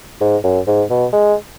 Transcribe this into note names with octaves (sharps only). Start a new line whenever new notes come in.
G#2
F#2
G#2
B2
G#3